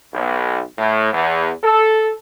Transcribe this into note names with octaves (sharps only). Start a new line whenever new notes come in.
B1
A2
E2
A4